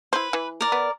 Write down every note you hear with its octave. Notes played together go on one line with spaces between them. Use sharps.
E4 B4 C5
E3
A#4 D5
B3